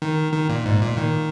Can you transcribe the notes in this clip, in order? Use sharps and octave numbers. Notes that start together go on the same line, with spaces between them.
D#3
D#3
A#2
G#2
A#2
D#3